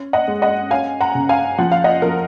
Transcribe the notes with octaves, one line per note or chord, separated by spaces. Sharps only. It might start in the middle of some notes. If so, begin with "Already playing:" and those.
Already playing: C#4
D#5 F#5
G#3
D#5 F#5
C#4 F5 G#5
F#5 A#5
C#3
F5 G#5
F3 F#5
F5
D#5 F#5
F3 A#4